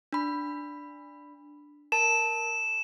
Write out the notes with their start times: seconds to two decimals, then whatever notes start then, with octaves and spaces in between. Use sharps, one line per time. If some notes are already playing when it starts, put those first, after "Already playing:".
0.12 D4 B5
1.92 A#4 A5 E7